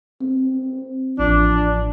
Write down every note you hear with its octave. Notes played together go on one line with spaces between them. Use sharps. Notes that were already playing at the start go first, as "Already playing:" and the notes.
C4
A1 F3 D4